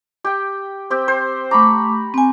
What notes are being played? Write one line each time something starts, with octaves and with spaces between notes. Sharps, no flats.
G4 G5
C4 G4 G5
C5
A3 A#5 B5 C#6 D6
C4 G#5